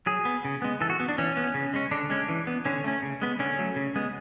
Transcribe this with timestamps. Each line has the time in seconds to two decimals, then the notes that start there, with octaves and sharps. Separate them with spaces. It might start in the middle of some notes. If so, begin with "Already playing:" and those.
0.06 F#3 G#4
0.25 B3
0.45 C#3
0.62 G#3 B3
0.81 E3 A4
0.90 F#4
1.00 B3
1.09 D4
1.18 E3 C#4
1.37 B3
1.54 C#3
1.74 G#3 C#4
1.91 D3 D4
2.10 G#3 C#4
2.28 E3
2.47 B3
2.65 D3 C#4
2.84 A3 C#4
3.03 C#3
3.21 G#3 B3
3.39 D3 C#4
3.58 F#3 A3
3.76 C#3
3.96 G#3 B3